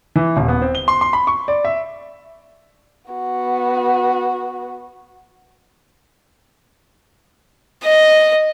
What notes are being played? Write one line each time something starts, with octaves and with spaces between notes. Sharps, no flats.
E3
D#1
B3
C4
G7
C6
C6
B5
C#6
D5
E5
B3 F#4
D#5